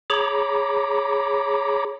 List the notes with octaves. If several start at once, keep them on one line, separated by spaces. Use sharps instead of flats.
G#4 C#5 A#5 B5 D6